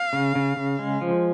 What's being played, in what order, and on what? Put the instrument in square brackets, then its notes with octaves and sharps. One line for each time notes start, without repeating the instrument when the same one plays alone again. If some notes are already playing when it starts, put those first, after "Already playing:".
Already playing: [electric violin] F5
[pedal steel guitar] C#3
C#3
C#3
G#3
F3